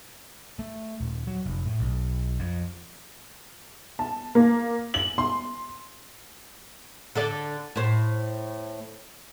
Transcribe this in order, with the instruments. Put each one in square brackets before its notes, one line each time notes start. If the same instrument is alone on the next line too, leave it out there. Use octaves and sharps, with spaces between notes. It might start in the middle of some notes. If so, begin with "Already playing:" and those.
[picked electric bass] A3
D#1
F#3
F1
A2
B1
F2
[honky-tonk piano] A5
A#3
F#7
C6
[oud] D3 A4 D5
A2 C5